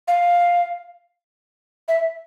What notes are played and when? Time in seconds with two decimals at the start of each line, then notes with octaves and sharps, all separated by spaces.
0.08 F5
1.88 E5